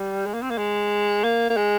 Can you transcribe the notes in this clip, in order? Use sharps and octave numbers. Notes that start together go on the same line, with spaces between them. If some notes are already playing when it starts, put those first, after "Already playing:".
Already playing: G3
G#3
A#3
C4
A#3
G#3
A#3
A#3
G#3